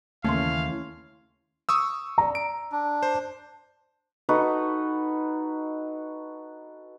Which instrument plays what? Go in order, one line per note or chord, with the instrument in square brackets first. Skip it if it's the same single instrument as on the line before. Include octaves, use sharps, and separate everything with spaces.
[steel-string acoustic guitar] D#2 C#3 E3 [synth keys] A3 [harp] C#4 C6 [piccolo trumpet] F5
[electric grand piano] C#6 D#6 E6
[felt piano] D5 A#5
[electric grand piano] D7
[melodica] D4
[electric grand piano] C5
[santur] D#4 F#4 A4 B4